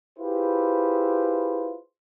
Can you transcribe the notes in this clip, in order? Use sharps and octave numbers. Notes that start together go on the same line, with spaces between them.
E4 F4 G4 G#4 B4 C5